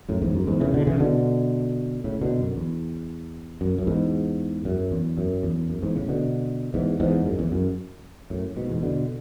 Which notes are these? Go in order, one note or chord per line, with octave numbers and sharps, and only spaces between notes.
F#2 A2
E2 G#2
F#2
E2 G#2
C#3 E3
B2 D3
C#3 E3
B2 D3
A2 C#3
B2 D3
F#2
E2
F#2
F#2
E2 G#2
F#2
E2
F#2
E2
F#2
E2 G#2
A2 C#3
B2 D3
E2 G#2
E2 G#2
F#2
E2
F#2
F#2 A2
G#2 B2
E2 G#2
B2 D3